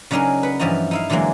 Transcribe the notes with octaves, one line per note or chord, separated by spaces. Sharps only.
C#3 F#3 D4 D#4 G#4 A#4
B4 F#5
G2 E3 F3 F#4 D#5 A#5
D#4 E4 F5
D3 E3 F#3 G#3 A#3